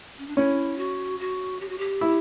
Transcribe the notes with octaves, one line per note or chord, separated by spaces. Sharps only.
C#4
D4
C#4 E4
F#4
F#4
G4
F#4
G4
E4